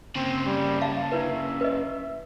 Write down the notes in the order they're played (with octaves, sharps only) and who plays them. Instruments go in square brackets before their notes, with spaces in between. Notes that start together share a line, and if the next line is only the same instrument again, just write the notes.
[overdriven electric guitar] C#3 A#3 [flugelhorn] C4
[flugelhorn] G3
[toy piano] F5 [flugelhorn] A5
[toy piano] D4 E4 B4 [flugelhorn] E5
[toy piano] B4 D#5